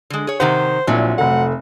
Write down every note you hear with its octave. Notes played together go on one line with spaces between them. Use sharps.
D3 G#3
G#4 C#5
C3 D#3 G4 C5 F#5
A#1 A#2 F#3 C4 E4
F1 A3 F#5